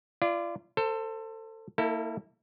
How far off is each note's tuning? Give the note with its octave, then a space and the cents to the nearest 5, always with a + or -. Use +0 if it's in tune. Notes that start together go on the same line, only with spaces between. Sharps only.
F4 -35 D5 +0
A4 +25 C5 +0
A#3 -25 E4 -20 A4 +25